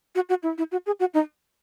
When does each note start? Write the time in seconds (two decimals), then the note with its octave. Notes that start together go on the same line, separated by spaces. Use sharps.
0.15 F#4
0.29 F#4
0.43 E4
0.58 E4
0.72 F#4
0.86 G#4
1.00 F#4
1.14 D#4